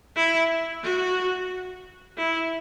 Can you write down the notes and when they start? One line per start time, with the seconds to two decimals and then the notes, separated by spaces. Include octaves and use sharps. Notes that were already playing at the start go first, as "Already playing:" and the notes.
0.16 E4
0.83 F#4
2.18 E4